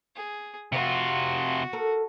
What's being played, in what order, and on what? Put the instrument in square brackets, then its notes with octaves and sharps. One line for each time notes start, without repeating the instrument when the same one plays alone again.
[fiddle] G#4
[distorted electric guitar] C3 F4 [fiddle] F#4
[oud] A4 A#4